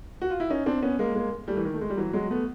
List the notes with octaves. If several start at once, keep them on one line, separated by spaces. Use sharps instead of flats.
F#4
F4
E4
C#4 D#4
C4 D4
B3 C#4
G#3 A#3
G#3 A#3
G3 A3
E3
D#3
A3
G#3
G3
E3 F#3
F#3 G#3
A3 B3